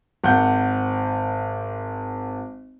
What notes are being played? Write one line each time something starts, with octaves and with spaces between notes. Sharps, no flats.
G#1 F#5 G6